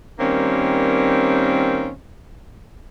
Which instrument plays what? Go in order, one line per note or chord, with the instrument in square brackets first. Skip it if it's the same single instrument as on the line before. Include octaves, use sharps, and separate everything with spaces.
[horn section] D#3 G3 A#3 C4 C#4